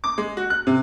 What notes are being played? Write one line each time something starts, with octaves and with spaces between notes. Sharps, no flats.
D6
G#3
F#4
F#6
C3